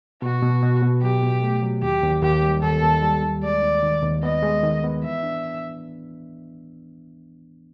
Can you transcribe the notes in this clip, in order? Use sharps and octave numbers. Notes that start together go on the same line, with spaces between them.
B2 F#4
B2
B2
B2
F#3 G4
B2
A3
F#3
D#2 G4
D#2
D#2 G4
G3
D#2 A4
D#2
G3
D#2
G#3 D5
D#2
D#3
D#2
B3 D#5
G#3
D#3
B3
E3 E5
D4